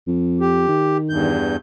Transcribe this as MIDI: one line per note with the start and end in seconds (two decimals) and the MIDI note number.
0.07 0.66 41
0.41 0.97 67
0.68 1.33 51
1.10 1.56 40
1.10 1.56 43
1.10 1.56 91